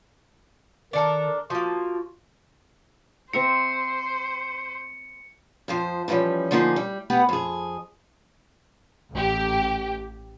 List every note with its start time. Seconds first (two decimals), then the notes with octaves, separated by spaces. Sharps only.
0.93 D#3 D4 A4 A#4
1.50 F3 A#3 F4 F#4
3.33 C4 C5 E5 A#5 C#7
5.68 F2 F3 C5
6.08 D3 E3 F3 G3 C#4
6.51 D3 F3 A#3 D#4 F4 G#4
6.76 G3
7.10 B3 G4 B4 F#5
7.29 F2 G#4
9.12 A1 G4